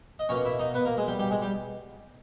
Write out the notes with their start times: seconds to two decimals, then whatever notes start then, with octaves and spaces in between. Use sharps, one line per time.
0.19 D#5
0.29 B2 A#3 C#4 C#5
0.45 E4 E5
0.59 D#4 D#5
0.74 B3 B4
0.85 A#3 A#4
0.97 G#3 G#4
1.07 G3 G4
1.19 G3 G4
1.31 G#3 G#4
1.42 G3 G4